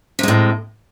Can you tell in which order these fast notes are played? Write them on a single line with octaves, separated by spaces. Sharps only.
C3 G#3 A2